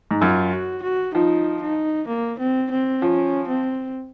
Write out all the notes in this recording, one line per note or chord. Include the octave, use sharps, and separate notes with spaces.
G#2
F#2 F4
F#4
F#4
F3 D#4
D#4
A#3
C4
C4
F3 C#4
C4